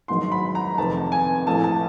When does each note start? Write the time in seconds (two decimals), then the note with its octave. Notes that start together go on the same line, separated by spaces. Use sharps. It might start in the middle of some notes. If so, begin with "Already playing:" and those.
0.08 A1 G#2 D#3 F#3 C6
0.32 B5
0.55 A#5
0.78 F1 F2 C3 D#3 A5
1.12 G#5
1.46 A#1 A2 E3 A5
1.64 A5